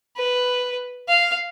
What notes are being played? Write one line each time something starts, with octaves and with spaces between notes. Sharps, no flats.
B4
F5